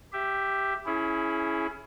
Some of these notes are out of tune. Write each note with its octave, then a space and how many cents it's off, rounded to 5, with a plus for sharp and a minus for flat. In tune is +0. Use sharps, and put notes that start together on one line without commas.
G4 +0 E5 +10
C#4 +0 E4 +0 G#4 +30